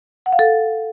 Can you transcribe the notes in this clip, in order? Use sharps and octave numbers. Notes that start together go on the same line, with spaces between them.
F#5
F5
A4